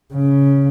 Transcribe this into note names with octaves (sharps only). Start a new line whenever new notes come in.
C#3